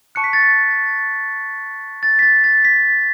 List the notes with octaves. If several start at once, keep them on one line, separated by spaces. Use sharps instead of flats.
A5 C#6 F#6 C#7
B6
A6
B6
A6
B6
A6
A6
B6